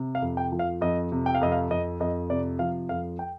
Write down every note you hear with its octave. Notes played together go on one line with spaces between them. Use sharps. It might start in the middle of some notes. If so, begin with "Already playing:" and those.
Already playing: C3
F5
F2
G5
F3
F5
F2 D#5
C3
G5
F5
F2 D#5
F5
F2 D#5
F2 D#5
C3 D5
F3 F5
F2 F5
G5